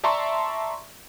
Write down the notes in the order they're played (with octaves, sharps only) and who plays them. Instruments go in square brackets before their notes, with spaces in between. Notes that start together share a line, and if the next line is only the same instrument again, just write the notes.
[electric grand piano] D5 E5 A5 A#5 C6 C#6